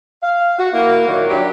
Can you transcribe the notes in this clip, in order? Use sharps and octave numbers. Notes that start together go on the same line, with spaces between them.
F5
F#4
A#3 E4
A#2 D#3 F#3
F#3 D4 E4 G4